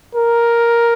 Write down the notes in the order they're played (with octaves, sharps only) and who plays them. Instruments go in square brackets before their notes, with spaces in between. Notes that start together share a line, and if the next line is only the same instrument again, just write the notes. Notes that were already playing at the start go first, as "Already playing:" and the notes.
[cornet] A#4